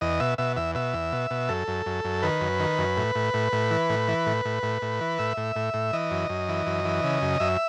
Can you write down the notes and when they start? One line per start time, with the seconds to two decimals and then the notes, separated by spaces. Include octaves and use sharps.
0.01 E2 D#5
0.20 B2 E5
0.38 B2 E5
0.56 E2 E5
0.75 B2 E5
0.94 E2
1.13 B2
1.31 B2
1.49 F#2 A4
1.68 F#2
1.86 F#2
2.04 F#2
2.22 D#3 B4
2.41 F#2
2.60 D#3
2.78 F#2
2.97 A2
3.15 A2
3.34 A2
3.52 A2
3.71 E3
3.90 A2
4.08 E3
4.27 A2
4.45 A2
4.63 A2
4.82 A2
5.01 E3
5.19 A2 E5
5.37 A2
5.56 A2
5.74 A2
5.93 E3 D#5
6.11 F#2
6.29 F#2
6.49 E3
6.66 F#2
6.85 E3
7.04 C#3
7.22 F#2
7.40 F#2 E5